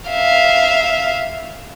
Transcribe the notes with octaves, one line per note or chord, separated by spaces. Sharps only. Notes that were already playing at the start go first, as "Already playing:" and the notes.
E5 F5